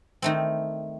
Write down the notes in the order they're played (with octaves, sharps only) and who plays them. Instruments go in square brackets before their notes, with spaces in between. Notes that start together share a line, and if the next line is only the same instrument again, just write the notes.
[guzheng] D#3 A3 C4